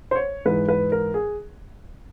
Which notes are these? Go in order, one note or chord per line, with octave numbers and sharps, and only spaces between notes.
C5
C#5
G#2 E3 B4
B4
A#4
G#4